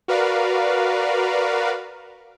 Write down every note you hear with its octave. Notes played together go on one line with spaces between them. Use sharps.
F#4 A#4 B4 D5 F5